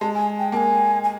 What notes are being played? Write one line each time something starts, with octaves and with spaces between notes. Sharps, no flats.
G#3 A5
G#5
G5
A#3 G#5 A5
G#5